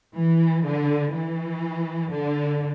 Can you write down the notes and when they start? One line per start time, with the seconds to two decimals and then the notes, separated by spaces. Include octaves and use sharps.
0.15 E3
0.63 D3
1.13 E3
2.12 D3